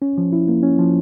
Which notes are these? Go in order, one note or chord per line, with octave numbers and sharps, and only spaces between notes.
C#4
F3
E4
A#3
C#4
F3